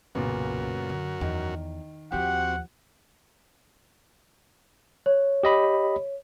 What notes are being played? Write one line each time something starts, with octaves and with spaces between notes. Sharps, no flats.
B1 F#2 A#2 C#3 B3 F#4 A#4
D3
E2 D#3
D#2 F3 C4 F#4 G4 F#5
C#5
G4 D#5 B5